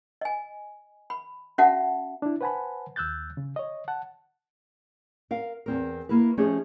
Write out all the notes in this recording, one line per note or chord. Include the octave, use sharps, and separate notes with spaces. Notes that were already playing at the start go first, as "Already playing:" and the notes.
D#5 G#5
B5
C#4 F#4 E5 F#5 A5
D4 E4
B4 C5 F#5 G#5 A5 B5
D#2 E6 F#6 G6 A6
C#3
C#5 D#5
F#5 A5
A#4 F5
E2 C4 A#4
A#3 E4 A#4 B4
F3 A3 C#4 D#4 G4 G#4